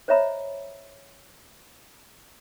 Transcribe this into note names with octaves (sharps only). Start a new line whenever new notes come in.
C5 C#5 D#5 E5 A#5 B5